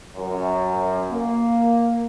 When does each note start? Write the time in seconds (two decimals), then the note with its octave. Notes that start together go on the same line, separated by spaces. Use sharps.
0.17 F#2
1.11 A#3